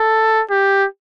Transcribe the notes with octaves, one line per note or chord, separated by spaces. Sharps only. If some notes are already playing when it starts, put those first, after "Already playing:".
Already playing: A4
G4